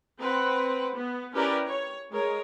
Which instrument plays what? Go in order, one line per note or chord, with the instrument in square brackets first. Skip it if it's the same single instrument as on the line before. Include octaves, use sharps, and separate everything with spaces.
[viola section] C4 B4 F#5
B3
C#4 E4 G4 A#4 B4 D5
C#5
G#3 A#4 C#5